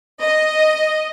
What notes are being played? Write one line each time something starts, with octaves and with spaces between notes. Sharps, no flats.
D#5